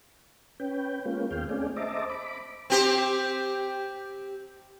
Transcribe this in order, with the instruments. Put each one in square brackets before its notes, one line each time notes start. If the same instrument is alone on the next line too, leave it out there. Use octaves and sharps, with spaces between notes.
[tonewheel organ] C#4 B4 G5
G#3 A#3 B3 C#4 F4
D#2 G#4 F5 G5
A3 C4 C#4 G#4 D5
C5 D#5 E5 A5 A#5 D6
B5 D6
[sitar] C4 G4 C5